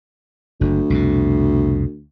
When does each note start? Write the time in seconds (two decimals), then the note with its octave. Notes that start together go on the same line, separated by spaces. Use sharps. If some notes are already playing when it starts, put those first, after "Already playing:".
0.61 F#1 D2
0.90 C2 F2 B2